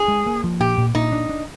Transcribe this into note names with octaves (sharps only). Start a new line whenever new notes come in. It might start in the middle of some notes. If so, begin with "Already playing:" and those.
Already playing: G#4
G#3
A#3
F3
A#2 G4
A#2
A#2 D#4
D4
D4